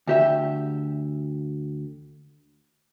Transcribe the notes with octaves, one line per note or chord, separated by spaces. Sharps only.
D2 G4 E5